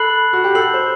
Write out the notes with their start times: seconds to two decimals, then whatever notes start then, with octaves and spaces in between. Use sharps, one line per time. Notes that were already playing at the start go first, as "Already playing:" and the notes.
Already playing: A4 B5 F#6 C7 F#7
0.33 F#4
0.44 G4
0.55 A4 E6 G6 C7 F#7
0.74 C5